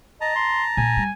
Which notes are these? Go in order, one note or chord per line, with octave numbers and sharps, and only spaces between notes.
D#5 A5 A#5
C6
A#2 G#5
G3